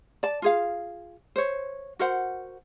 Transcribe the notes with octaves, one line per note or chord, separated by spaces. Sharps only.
D5 A5
F4 G#4 F5
C5 C#5
F#4 A#4 C5 F#5